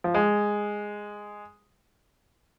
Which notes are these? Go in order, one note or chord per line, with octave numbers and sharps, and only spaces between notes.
F3
G#3